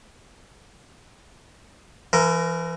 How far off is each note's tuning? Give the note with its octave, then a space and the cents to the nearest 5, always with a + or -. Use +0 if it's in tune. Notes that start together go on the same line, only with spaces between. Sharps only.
E3 +35 A#4 +0